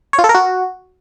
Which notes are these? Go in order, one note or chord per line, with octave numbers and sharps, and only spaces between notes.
C#5
F4
A4
A#4
F#4